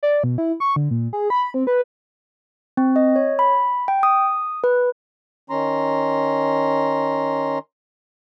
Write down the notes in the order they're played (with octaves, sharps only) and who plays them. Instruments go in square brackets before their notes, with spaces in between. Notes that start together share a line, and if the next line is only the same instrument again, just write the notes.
[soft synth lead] D5
B2
E4
C#6
D3
A#2
G#4
B5
C4
B4
[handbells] C4
D#5
C#5
B5
G5
D#6
B4
[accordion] D#3 C#4 A#5 C6